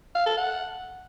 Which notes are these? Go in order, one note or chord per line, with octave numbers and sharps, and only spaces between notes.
F5
A4
F#5